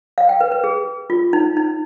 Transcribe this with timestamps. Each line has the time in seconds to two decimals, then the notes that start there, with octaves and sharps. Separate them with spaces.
0.18 F5
0.29 G5
0.41 B4
0.52 B4
0.64 G#4
1.10 F4
1.33 D#4
1.57 D#4